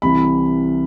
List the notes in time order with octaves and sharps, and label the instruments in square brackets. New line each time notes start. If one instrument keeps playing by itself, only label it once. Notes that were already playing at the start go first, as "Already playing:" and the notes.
[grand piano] C2 C3 E3 B5